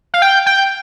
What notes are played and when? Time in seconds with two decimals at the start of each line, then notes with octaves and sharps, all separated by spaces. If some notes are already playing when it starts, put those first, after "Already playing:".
0.14 F5
0.22 G5
0.46 G5